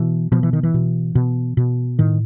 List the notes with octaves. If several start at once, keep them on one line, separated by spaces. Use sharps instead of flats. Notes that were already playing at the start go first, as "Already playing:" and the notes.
Already playing: B2 E3
B2 F3
E3
D#3
E3
B2
B2
B2
A2 D#3